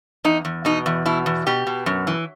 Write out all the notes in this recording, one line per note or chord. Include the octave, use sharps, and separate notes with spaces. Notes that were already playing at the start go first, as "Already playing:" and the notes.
E2 D#4
E2
B2 D#4
E2
B2 E4
E2
B2 G4
B2
F#2
E3